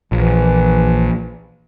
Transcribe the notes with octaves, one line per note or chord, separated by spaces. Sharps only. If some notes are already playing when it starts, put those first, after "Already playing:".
A#1 E3